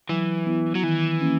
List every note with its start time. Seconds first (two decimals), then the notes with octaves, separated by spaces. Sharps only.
0.09 E3 F#3
0.46 B3 E4
0.75 F#3
0.83 D#3 E3
1.20 A#3 C#4